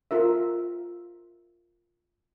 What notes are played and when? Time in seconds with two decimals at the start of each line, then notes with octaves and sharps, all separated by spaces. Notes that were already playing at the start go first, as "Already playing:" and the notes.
0.11 F4 A#4 E5